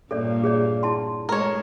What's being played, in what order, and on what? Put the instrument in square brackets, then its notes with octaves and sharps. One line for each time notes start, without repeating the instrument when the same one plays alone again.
[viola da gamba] G2 A#2 A#3 [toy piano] A4 C#5 D5
[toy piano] G#4 C#5 D5
E4 A5 C6
[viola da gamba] G#3 A3 [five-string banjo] A#4 C#5